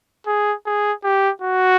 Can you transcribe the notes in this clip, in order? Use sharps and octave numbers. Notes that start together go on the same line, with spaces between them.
G#4
G#4
G4
F#4